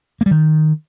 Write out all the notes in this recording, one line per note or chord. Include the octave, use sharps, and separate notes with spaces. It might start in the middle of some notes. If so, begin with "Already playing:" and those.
A#3
G3
D#3